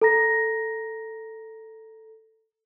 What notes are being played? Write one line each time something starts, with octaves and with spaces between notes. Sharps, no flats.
A4 A#5 A#6